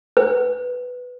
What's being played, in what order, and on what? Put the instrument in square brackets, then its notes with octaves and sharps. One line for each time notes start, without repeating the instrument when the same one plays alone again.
[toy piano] B4